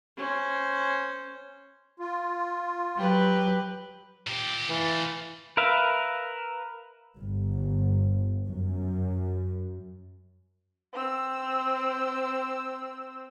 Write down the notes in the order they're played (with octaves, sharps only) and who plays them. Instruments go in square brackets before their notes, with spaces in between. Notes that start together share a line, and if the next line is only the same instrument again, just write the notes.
[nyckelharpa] C#4 C5
[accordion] F4
[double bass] F#3 [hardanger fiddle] G4 B4
[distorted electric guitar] A#2 G4
[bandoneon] E3 [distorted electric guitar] A3 F4
[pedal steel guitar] A#4 B4 E5 F5
[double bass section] G1
F#2
[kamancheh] C4 E6